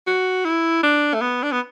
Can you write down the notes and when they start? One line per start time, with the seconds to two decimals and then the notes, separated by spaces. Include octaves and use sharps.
0.07 F#4
0.45 E4
0.83 D4
1.14 A3
1.21 B3
1.43 D4
1.52 B3